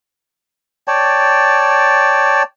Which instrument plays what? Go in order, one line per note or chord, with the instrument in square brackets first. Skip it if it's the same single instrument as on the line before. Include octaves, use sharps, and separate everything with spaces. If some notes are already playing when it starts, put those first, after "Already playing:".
[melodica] C#5 D5 G5 A5